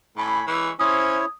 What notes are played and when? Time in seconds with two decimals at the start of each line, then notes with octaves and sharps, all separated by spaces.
0.17 A2 C#5 G#5 B5
0.47 E3 G#3 C#6
0.80 C#4 E4 C5 C#5 D#6